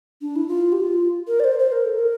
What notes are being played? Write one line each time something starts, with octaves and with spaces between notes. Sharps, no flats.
D4
E4
F4
G4
F4
A#4
D5
C5
C5
A#4
A4
A#4